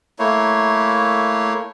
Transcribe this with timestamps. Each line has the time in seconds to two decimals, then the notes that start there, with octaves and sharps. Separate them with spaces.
0.19 A3 A#3 E4 C#5